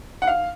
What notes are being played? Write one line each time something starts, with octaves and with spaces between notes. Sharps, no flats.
F#5
F5